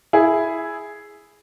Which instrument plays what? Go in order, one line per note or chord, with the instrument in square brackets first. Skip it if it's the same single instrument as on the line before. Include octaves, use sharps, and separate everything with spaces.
[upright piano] E4 G#4